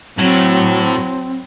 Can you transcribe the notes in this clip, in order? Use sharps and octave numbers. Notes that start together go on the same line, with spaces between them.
A2 F#3 C4